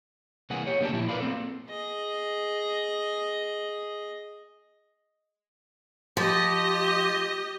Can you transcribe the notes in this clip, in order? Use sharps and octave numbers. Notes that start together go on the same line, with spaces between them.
C2 E3 A#3 G#4 F#5
G4 C#5
D3 A#3 G4 D5 A5
A#2 F3 E4
A#4 B4 D5 F5 B5
A#3 C4 A4
G#4 D#5
F3 G4 D#5